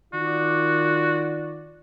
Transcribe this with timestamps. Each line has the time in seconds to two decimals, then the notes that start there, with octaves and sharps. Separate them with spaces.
0.13 D#3 F4 F#4 D5